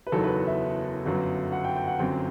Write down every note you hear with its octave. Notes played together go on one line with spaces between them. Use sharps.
B4
F#1 E2 D#3 F#3 B3 A4
B4
E5
G1 F#2 F#3 B3
F#5
G5
G5
F#5
G1 F#2 F#3 C4 G5